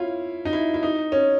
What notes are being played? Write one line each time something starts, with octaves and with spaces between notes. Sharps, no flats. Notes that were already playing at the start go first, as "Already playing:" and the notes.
Already playing: C#4 E4 F4
D#4
E4
E4
D#4
C#4